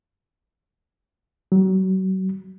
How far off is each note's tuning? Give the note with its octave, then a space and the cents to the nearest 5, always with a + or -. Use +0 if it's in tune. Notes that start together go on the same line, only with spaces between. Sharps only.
F#3 +35